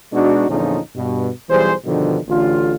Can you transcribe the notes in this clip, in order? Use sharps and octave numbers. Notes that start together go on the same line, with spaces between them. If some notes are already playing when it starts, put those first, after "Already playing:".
B2 G#3 D4 D#4 F#4
E2 A#2 D3 F3 C#4 D#4
G2 B2
B1 E3 G3 G#4 C5
G2 B2 D3 D#3 F3
A1 D3 F4